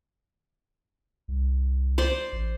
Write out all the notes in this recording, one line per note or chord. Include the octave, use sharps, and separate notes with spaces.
C2
C5 D5 C6
A1